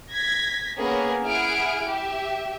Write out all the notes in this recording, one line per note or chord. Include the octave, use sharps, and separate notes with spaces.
G#6 A#6 B6
A#3 B3 C#4 G#4 A#4 B4
E4 G#4 E5 F#5 F6 D7
G4 E5